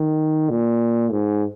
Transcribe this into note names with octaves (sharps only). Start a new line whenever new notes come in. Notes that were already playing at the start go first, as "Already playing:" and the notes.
Already playing: D#3
A#2
G#2